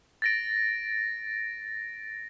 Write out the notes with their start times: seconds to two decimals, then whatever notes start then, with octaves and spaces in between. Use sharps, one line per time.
0.22 A6 A#6 D7